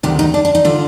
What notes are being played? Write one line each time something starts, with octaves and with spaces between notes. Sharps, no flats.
D2 C3 D#3 G4
D#4
D4
D4
D#4
D3 F4